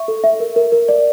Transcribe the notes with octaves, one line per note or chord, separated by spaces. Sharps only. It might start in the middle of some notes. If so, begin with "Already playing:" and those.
Already playing: E5 C#6
A4
E5
A#4
A#4
A#4
D5